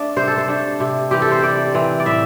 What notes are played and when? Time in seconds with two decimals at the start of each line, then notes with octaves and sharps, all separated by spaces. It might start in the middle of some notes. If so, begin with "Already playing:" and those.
Already playing: A3 D4
0.16 C3 C5
0.28 A4
0.37 C5
0.48 A3 D4
0.80 C3
1.11 E3 C4 G4
1.22 A4
1.32 C5
1.43 C3 D5
1.74 E3 C4
2.00 D5
2.06 A2 E5